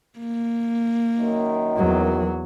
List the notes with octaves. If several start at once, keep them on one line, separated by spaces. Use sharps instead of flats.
A#3
F#2 D#3
E2 F#3